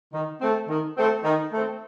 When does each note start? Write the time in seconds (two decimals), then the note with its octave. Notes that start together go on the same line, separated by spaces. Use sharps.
0.12 D#3
0.40 A3 C4
0.68 D#3
0.97 A3 C4
1.24 D#3
1.52 A3 C4